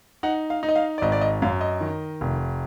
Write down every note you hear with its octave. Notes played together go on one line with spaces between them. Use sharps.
D#4 F#5
F5
D#4
D#5
F5
D5
G#1 D#5
D5
D#5
F#2 F5
D#5
D#3
F1